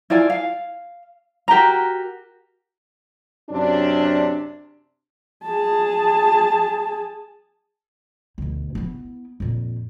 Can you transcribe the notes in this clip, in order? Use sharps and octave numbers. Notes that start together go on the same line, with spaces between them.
E4 F4 D5 G#5
F5
F#4 G4 A#4 A#5
F#2 C3 C#4 D4
G#4 A5
D2 B2
B3 E4
F2 A#2